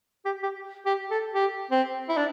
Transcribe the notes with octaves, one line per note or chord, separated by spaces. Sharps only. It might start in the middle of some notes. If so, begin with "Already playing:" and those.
G4
G4
G4
A4
G4
C4
E4
D4